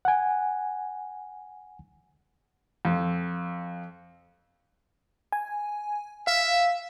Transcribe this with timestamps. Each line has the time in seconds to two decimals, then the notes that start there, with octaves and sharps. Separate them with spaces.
0.05 F#5 G#5
2.85 F2
5.32 G#5
6.27 E5 F5